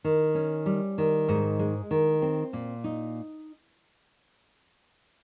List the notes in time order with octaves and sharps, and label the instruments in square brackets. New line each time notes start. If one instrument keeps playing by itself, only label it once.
[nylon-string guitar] D#3
C#4
G3
D#3
G#2
G#3
D#3
C4
A#2
D#4